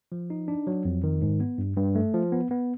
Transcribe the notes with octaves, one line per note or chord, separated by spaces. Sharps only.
F3
D#4
D4
F#3
F2
D#3
G#2
B3
G2
G2
A3
F3
B3
B3